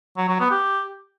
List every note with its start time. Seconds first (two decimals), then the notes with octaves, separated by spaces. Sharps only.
0.17 F#3
0.29 F#3
0.40 B3
0.51 G4